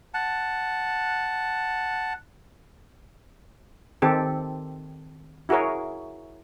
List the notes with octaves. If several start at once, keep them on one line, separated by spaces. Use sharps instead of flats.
F#5 A5
D#3 C4 G4 A4
E4 F#4 G#4 A#4 C#5